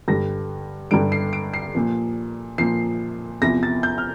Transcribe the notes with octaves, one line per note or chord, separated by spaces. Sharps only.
G2 D3 G3 A#6
G2 D3 G3 D7
C7
D7
C7
A#2 F3
A#2 F3 C7
E2 C3 F3 A#6
A6
G6
F6